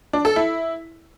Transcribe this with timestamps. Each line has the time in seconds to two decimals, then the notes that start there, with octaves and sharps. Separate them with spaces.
0.13 D4
0.25 A4
0.36 E4